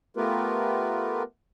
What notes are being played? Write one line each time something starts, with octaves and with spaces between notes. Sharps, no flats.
A3 B3 F4 G4 A#4 B4